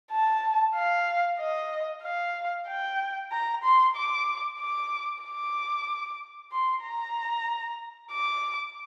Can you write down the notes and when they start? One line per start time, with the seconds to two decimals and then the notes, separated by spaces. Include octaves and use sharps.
0.12 A5
0.76 F5
1.39 D#5
2.03 F5
2.68 G5
3.32 A#5
3.64 C6
3.96 D6
4.60 D6
5.23 D6
6.52 C6
6.83 A#5
8.12 D6